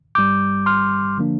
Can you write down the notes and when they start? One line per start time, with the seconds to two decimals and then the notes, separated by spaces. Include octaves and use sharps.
0.15 G1 G2 G3 D6 G6
0.66 C6 F6
1.18 D3 F3 A#3 D4